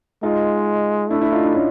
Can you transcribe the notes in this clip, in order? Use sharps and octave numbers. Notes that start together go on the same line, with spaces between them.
G#3 D#4 F4
A3 D4 E4
D4 E4
D#4 F4
D4 E4
C#4 D#4